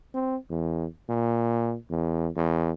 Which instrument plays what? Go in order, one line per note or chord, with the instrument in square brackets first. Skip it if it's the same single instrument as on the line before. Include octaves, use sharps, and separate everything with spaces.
[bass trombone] C4
E2
A#2
E2
E2